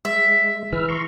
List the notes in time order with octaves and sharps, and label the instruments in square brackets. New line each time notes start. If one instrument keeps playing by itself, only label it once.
[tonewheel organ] G#3 [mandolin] E5
[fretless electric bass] E3 [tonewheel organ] B4 E6 F6
[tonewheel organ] A#5 C6 C#6